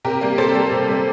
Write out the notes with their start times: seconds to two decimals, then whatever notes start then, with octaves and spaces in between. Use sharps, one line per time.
0.05 C3 G4 A#4
0.21 G3 A#3
0.38 C3 A4 C5
0.55 G3 A#3
0.71 C3
0.88 G3 A#3